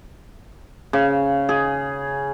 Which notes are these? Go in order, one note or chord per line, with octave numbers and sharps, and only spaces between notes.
C#3
G#4